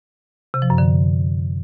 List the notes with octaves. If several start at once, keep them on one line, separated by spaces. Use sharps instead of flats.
C3
F3
F#2
D3